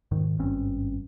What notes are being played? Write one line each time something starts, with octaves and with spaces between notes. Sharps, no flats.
F1 G#2 D#3
G#1 G2 C4 C#4